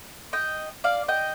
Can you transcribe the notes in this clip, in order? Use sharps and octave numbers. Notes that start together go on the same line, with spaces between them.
D#5 G5
D5 F5
D#5 G5